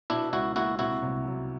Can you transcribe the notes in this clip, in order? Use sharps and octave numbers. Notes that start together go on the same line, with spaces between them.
B2 D4 E4
C#2 E4 F#4
A#3 E4 F#4
C3 E4 F#4
C2
F#3